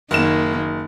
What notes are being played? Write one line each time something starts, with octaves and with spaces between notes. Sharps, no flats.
F#1 D#3 A#3 E7